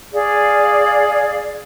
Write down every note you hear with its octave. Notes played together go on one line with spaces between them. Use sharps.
G#4 D5 F5